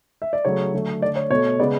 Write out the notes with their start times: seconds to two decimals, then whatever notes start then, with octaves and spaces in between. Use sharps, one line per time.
0.22 E5
0.33 D5
0.45 C#3 F#3 A3 C#5
0.74 D3 F#3 A3
1.02 A3 D5
1.06 D3
1.16 C#5
1.30 B2 A3 C#5
1.60 C#3 G#3 B3 D5